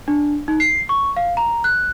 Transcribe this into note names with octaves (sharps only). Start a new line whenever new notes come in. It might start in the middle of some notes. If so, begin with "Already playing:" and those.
D4
D#4
C7
C#6
F5
A#5
F#6